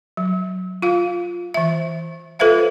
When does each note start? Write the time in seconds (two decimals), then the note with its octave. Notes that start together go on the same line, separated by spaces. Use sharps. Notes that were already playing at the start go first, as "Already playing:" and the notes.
0.17 F#3
0.82 F4 F5
1.54 E3 E5
2.39 F4 A4 B4 C5 E5 F5